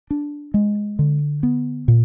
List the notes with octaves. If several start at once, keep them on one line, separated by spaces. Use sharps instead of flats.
D4
G#3
D3
B3
A#2